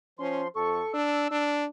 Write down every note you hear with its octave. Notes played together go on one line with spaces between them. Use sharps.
F3 C#4 C6
F2 A4 C#6
D4 E6
D4